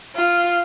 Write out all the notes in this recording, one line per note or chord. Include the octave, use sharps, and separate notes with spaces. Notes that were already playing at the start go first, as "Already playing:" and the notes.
F4